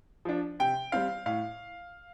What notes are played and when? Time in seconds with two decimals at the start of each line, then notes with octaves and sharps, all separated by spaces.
0.25 F3 D4
0.59 C3 G5
0.92 G3 C4 F5
1.26 A2 F5